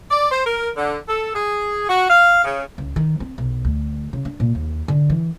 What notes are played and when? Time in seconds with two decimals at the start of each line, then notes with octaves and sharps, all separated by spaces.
0.11 D5
0.31 C5
0.46 A#4
0.77 D3
1.08 A4
1.35 G#4
1.89 F#4
2.10 F5
2.44 C#3
2.78 C#2
2.96 D#3
3.20 C4
3.38 B1
3.65 D2
4.13 C#3
4.25 D4
4.40 A#2
4.55 D#2
4.88 D3
5.10 E3